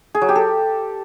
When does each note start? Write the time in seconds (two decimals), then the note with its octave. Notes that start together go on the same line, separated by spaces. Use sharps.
0.15 G#4
0.22 F#3
0.29 G4
0.36 A4